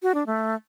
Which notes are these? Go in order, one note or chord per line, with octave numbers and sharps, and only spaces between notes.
F#4
D4
A3